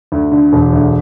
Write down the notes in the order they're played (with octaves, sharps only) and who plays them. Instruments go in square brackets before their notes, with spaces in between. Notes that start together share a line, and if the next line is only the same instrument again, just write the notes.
[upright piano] D2
D3
E1
D2